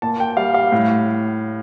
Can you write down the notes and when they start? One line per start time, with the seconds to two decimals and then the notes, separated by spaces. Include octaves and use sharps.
0.02 A#2 A5
0.20 G5
0.37 G3 F5
0.54 F5
0.72 A2